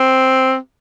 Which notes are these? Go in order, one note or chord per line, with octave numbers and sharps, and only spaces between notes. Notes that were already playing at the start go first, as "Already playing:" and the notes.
Already playing: C4